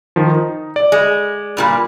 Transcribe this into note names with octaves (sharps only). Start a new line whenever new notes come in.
D#3 F3
D#4
D5
G#3
G2 A#2 G3